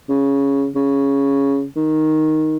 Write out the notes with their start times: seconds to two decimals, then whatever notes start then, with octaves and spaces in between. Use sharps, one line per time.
0.09 C#3
0.76 C#3
1.76 D#3